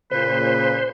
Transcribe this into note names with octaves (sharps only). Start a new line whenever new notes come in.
A#2 C#3 B4 C5